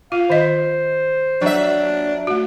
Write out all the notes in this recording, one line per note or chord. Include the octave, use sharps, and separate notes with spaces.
F4 F5
D#3 C5 D#5
F#3 D4 E5
A3 F#4